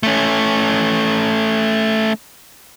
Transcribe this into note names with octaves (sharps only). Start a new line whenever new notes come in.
A3 C#4